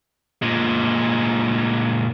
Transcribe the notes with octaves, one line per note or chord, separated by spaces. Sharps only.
A#2 G#3